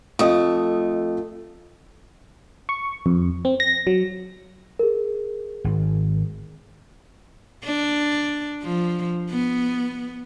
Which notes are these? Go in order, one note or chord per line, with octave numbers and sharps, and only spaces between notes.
F2 A3 D#5 D#6
C#6
F2
C4
A#6
F#3
G#4 A#4
G#1
D4
F3
B3